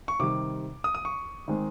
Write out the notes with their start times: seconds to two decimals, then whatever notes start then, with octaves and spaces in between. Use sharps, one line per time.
0.08 C#6
0.19 C3 D#3 G3 D6
0.84 D#6
0.95 D#6
1.05 C#6
1.48 D#3 G#3 C4